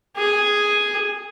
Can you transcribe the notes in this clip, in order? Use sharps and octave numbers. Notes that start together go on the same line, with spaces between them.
G#4 G#5